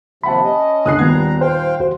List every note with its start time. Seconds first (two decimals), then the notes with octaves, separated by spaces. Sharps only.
0.24 D#2 C3 F3 E5 F#5 A5 B5
0.43 C#4 D#5
0.86 C#2 D3 D#6 F#6 C7
0.99 D#1 D#2 G3 B3 A#5 G#6
1.41 C5 F5 G5
1.80 D#2 F#4 C5